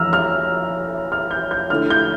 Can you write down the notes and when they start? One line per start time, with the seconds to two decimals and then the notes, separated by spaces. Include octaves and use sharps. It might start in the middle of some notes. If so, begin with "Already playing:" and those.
Already playing: F2 E3 A3 A#5 E6 F6
0.13 F6
1.12 F6
1.31 G6
1.51 G6
1.70 D3 A3 E4 F6
1.90 G6